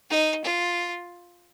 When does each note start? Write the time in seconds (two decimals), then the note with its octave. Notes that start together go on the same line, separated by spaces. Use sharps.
0.10 D#4
0.44 F4